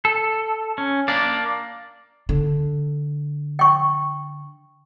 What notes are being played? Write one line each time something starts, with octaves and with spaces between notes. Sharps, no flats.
A4
C#4
A#3 D4 D5
D3
G5 C#6